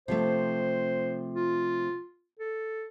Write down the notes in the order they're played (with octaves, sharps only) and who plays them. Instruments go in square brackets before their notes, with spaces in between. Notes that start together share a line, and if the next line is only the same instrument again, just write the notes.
[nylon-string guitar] C3 F3 A3 [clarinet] C5
[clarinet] F4
A4